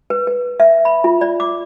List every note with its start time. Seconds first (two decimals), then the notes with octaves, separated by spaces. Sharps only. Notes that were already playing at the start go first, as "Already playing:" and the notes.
0.10 B4
0.27 B4
0.60 E5
0.85 B5
1.04 F4
1.21 D5
1.40 D6